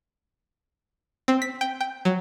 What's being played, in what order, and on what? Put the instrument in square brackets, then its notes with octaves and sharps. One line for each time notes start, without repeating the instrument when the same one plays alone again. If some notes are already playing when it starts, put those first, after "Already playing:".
[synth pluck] C4
B6
G5
G5
F#3